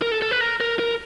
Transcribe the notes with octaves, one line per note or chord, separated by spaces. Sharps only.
A#4
A4
A4
B4
A#4
A#4
A#4